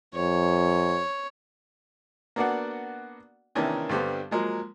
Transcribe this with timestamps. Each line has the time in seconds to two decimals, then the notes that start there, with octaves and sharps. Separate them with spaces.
0.15 F2 C#5
2.36 A#3 B3 D4 F#4 D5 F#5
3.55 C3 D#3 E3 A#3 C#4 D4
3.89 G2 D3 G3 B3 C4
4.31 F3 F#3 G#3 A#3